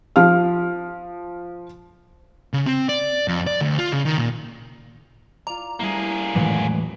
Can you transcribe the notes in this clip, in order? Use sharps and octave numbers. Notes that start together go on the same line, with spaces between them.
F3 F5 F6
C#3
C4
D5
F2
D5
D2
F4
C#3
D#3
A#2
F4 D5 A#5
G3 A3 A#3 E4 G#4
D#1 A2 E3 F#3 G#3 F#5 G#6